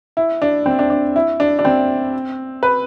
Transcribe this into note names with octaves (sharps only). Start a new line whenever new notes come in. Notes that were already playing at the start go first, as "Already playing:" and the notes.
E4
D4
C4
D4
D4
E4
D4
D4
C4
B4